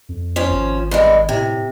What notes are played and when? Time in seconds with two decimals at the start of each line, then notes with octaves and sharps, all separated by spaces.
0.09 F2
0.36 F3 C#4
0.50 G#1
0.91 G2 D3 G#3
1.29 A2 C3